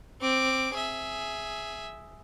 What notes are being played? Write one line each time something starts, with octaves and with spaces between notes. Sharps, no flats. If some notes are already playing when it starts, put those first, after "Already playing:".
C4 D6
G#4 E5